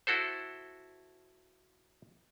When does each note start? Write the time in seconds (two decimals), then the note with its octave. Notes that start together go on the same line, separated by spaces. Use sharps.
0.07 E4 F#4 A4 C5